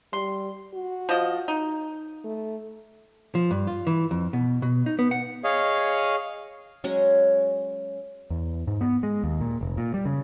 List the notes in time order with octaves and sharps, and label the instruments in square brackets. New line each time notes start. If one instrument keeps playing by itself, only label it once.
[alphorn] G3 [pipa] C6
[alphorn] F#4
[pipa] F3 D#5
D#4
[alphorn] A3
[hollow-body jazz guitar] F3
G2
F4
E3
F2
B2
B2
D#4
B3
F#5
[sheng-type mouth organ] G#4 C#5 D#5 F5
[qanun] F#3 G#3 C#4 G#4
[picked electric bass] E2
G#2
B3
G#3
D#2
A#2
F1
A#2
G3
C#3